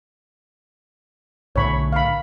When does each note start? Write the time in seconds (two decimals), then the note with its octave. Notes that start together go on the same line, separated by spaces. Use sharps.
1.56 B1 A2 D3 C#5 B5 C#6
1.92 F5 B5